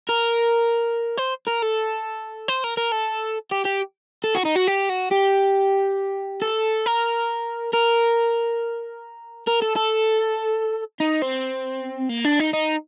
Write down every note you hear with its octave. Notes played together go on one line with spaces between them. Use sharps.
A#4
C5
A#4
A4
C5
A#4
A#4
A4
G4
G4
A4
F#4
D#4
F#4
G4
F#4
G4
A4
A#4
A#4
A#4
A4
A4
D#4
C4
A#3
D4
D#4
D#4